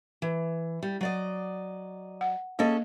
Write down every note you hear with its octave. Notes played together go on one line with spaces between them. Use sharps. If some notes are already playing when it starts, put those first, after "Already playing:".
E3
G3
F#3 D5 D#5
F#5
A#3 C#4 G#4 A4 D#5